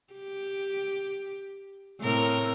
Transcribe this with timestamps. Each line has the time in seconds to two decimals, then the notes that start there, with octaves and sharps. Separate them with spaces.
0.13 G4
2.01 A2 C4 A#4